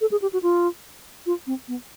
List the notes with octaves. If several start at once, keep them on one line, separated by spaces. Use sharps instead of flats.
A4
G#4
G4
F#4
F4
F4
C4
B3